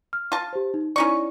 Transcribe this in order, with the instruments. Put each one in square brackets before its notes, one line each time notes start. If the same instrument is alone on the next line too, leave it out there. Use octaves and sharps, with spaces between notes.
[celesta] F6
[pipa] F4 A5
[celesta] G4 C5
D#4
[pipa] C#4 D#4 C#6 [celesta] E4 D5